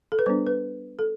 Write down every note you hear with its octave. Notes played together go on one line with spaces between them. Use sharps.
A4
B4
G3 B3 D4 C5
B4
A4